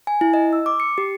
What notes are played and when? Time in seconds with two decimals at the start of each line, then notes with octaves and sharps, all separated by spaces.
0.07 G#5
0.21 E4
0.34 D#5
0.53 E6
0.66 D6
0.80 C#7
0.98 G4